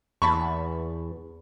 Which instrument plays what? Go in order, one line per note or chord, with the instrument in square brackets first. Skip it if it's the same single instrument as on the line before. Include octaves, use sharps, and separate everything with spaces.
[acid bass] E2 [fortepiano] A5 B5 C#6